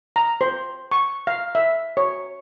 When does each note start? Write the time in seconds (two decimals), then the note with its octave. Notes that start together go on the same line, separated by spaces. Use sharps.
0.16 A#5
0.41 C5
0.91 C#6
1.27 F5
1.55 E5
1.97 C#5